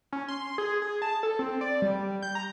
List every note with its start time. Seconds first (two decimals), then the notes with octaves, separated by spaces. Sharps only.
0.12 C#4
0.28 C6
0.58 G#4
0.82 G#4
1.02 A5
1.23 A4
1.39 C4
1.61 D5
1.82 G3
2.23 G6
2.35 A#5